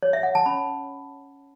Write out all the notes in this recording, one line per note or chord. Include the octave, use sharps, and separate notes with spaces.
C#5
E5
F#5
A5
C#4 B5